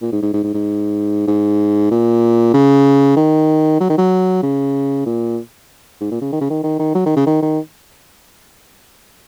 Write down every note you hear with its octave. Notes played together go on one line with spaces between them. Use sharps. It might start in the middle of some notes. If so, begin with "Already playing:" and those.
A#2
G#2
G#2
G#2
G#2
G#2
G#2
A#2
C#3
D#3
F#3
D#3
F#3
C#3
A#2
G#2
A#2
C#3
D#3
C#3
D#3
D#3
D#3
F#3
D#3
C#3
D#3
D#3